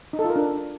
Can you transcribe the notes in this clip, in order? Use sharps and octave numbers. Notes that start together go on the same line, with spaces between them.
D#4
A4
F4
A#4
D4